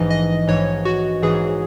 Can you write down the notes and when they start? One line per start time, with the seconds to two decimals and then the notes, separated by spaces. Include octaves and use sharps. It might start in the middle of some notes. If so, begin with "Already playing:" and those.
Already playing: A#1 G#2 E3 D#5
0.10 D#5
0.47 A#1 G#2 E3 C#5
0.85 F#4
1.22 A#1 G#2 E3 G#4